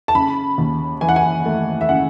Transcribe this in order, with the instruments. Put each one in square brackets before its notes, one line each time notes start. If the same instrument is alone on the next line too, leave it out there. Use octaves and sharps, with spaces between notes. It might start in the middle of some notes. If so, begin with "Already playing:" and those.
[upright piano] A5
C#3 B5
D#2
E3 G#5
F#5
G#5
A3
E5
C#3 F#5